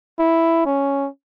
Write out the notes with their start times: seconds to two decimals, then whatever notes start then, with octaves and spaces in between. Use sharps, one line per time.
0.19 E4
0.66 C#4